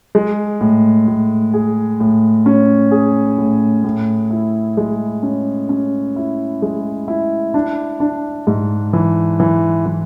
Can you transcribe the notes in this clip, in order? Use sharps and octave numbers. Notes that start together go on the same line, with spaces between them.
G#3
A2
A2
G#4
A2
C#4
G#4
A2
A2
E4
G#3
C#4
C#4
E4
G#3
E4
D4
D4
G#2
E3
E3
E3